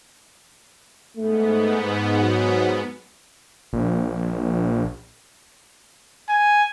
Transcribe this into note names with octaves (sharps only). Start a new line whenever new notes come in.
G#2 A3 B3
F#3
A#1
G#5